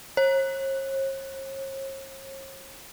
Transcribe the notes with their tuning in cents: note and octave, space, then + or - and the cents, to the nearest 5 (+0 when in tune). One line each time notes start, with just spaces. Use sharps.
C#5 -45